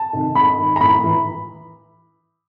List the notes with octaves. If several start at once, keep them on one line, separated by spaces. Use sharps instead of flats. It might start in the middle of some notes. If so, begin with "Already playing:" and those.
Already playing: A5
C3 D#3
G#2 B5
D#3
A#5
A2 B5
E3